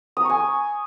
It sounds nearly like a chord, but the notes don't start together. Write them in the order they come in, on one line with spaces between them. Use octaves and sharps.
D#6 A#5 C#6 G#5